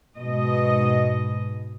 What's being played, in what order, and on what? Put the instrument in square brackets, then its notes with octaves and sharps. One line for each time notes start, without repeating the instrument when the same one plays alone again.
[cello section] G#2 B2 D#5